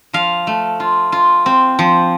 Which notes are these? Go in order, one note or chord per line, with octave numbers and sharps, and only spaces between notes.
F3 F5
A3
F4
F4
C4
F3